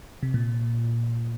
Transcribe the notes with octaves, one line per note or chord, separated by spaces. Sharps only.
C3
A#2